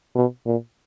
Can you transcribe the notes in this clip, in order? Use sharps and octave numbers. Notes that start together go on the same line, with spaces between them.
B2
A#2